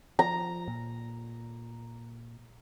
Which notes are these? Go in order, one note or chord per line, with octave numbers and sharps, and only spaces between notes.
F3 A#5
A#2